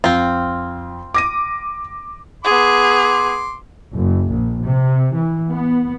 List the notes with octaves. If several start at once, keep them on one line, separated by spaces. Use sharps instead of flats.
F2 C4 F4
D6 A#6 D#7
B3 G#4 C6 D6
F#1
A#1
C3
E3
B3